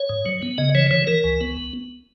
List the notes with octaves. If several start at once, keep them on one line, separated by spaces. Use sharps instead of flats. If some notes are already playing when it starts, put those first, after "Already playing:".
Already playing: C#5
G#2
F#3
B3
C#3 D#5
E3 C#5
E3 C#5
E3 A#4
C#2
B3